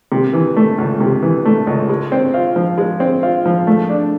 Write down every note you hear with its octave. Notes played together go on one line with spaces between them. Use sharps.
C3
E3
A3
C#2
C3
E3
A3
C#2
G#3
C4
F4
F3
G#3
C4
F4
F3
A3
D4